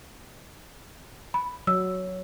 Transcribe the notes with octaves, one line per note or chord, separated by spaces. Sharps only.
B5
F#3 E6